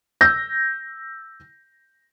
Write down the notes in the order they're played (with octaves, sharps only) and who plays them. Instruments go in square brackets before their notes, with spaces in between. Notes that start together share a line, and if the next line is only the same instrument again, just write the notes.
[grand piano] E6 G6 A#6